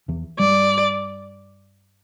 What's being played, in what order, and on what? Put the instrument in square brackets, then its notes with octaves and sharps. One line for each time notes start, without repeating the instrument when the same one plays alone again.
[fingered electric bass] E2 E3
[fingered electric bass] G2 G3 [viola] D5